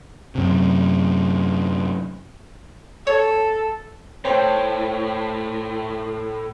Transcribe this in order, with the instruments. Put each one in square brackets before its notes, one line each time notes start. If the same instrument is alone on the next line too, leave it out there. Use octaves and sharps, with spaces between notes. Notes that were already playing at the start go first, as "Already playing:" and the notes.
[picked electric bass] F#2 C3
[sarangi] A4 [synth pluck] C#5
[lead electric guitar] A2 [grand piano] C5 C#5 G5